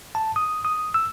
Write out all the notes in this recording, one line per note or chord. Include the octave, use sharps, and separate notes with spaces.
A5
D#6
D#6
E6